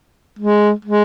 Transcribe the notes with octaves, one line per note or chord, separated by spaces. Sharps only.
G#3
G#3